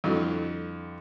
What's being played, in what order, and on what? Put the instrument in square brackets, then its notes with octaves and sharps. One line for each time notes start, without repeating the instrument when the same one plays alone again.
[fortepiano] F2 D3 [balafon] G3 E4 F#4